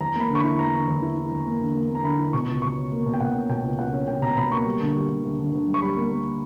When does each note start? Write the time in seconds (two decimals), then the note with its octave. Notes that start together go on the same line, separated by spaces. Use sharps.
0.01 E2 A#5
0.15 A#3 B5
0.30 D3
0.35 C#6
0.40 E4 B5
0.59 E2 A#5
0.74 D3
0.88 E2
1.02 E4
1.17 E4
1.32 E2
1.46 A#3
1.61 D3
1.75 A#3
1.90 A#3
1.95 A#5
2.04 D3 B5
2.19 E4
2.33 B2 C#6
2.48 C#2
2.62 B2 C#6
2.77 C#4
2.92 A#3
3.06 B2
3.14 G5
3.20 B2 F#5
3.35 C#4
3.49 B2 G5
3.64 C#2
3.78 C#2 F#5
3.93 C#4
4.08 C#2 G5
4.22 B2 A#5
4.37 B2 B5
4.51 A#3 C#6
4.66 G3
4.80 D3
4.95 G3
5.09 D3
5.24 D2
5.38 D3
5.53 D2
5.67 G3
5.74 C#6
5.82 G3 B5
5.97 A#3
6.11 A#3